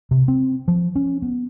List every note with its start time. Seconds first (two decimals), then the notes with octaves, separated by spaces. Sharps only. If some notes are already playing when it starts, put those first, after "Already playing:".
0.11 C3
0.28 C4
0.68 F3
0.96 C#4
1.22 B3